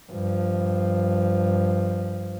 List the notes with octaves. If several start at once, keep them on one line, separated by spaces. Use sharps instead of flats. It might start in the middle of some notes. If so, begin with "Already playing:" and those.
G2 F3